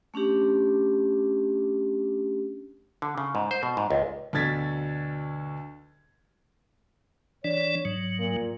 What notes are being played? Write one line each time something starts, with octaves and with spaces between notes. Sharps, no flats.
A3 C#4 D4 G4
D3
C#3
G#2
C5
B2
G#2
C#2
D2 B2 D3 G#6 A6 B6
E3 D4 C#5 D5
G#2 F#3
A#2